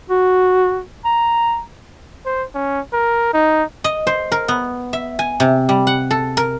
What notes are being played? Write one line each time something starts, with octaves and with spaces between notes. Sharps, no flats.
F#4
A#5
C5
C#4
A#4
D#4
D#5
C5
A#4
B3
E5
G#5
C3
G3
F#5
A4
A#4